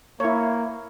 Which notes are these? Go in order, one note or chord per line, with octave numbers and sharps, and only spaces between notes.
A#3 E4 C#5